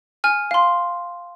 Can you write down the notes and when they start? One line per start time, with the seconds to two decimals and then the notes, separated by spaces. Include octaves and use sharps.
0.24 G#5 F6
0.51 F5 C6